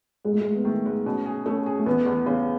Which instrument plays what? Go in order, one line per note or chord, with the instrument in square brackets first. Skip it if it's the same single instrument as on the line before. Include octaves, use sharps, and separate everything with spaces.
[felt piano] G#2 [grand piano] G#3
[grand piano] A3
[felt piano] G#2 [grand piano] G#3
[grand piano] B3
[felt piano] D#3 [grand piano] A3
[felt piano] G#2
[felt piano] B2 [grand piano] C#4
[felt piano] G#4
[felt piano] A3 [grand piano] C#4
[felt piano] G#4
[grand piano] A3
[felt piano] E2 [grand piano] B3
[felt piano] E2
[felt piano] C#3 [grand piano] B3